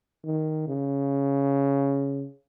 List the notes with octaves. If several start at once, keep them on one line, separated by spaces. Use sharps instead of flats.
D#3
C#3